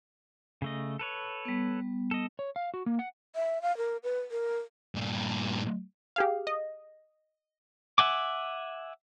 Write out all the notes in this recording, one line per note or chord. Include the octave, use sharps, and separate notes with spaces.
C#3 A3 D#5
A4 B4 C#5
G3 B3
A4 D#5
C#5
F5
F#4
A#3
F#5
E5
F5
A#4
B4
A#4
G2 A#2
G4 G#4 F5
D#5
E5 F#5 G#5 D6